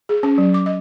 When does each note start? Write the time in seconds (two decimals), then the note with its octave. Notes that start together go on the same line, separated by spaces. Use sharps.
0.09 G#4
0.23 C#4
0.38 F#3
0.54 D6
0.66 D#5